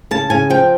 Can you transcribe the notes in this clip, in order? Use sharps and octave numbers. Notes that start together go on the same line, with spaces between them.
C#3 A5
C#3 G#5
F3 G5